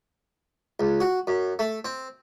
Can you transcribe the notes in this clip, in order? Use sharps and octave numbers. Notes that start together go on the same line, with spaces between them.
C#2
F#4
F#2
A3
C4